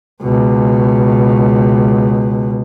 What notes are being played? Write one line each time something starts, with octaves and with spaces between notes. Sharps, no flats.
C#2 B2